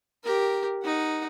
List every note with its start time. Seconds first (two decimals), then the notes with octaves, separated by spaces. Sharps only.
0.24 G4 A#4
0.83 D#4 F#5